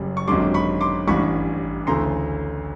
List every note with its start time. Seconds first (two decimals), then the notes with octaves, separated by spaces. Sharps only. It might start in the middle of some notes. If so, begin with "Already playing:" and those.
Already playing: F#1 F#2 G3
0.17 C#6
0.27 G#1 F#2 D3 G3 C6 D6
0.54 B5 C#6
0.81 C6 D6
1.07 A1 G2 E3 G3 B5 C#6
1.87 D2 C#3 E3 A3 A#5 C6